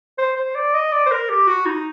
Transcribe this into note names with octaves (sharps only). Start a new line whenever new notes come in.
C5
C5
D5
D#5
D5
C5
A#4
G4
F#4
D#4